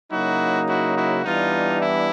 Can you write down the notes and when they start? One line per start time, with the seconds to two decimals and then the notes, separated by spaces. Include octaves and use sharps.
0.10 C#3 F#3 A#3 D#4 E4 F#4
0.67 E4 F#4
0.96 E4 F#4
1.24 E3 G3 B3 D4 D#4 F4
1.82 E4